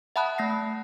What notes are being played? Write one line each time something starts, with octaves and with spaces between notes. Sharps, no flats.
E5 F#5 A5 B5 D#6 F#6
A3 A#6 C7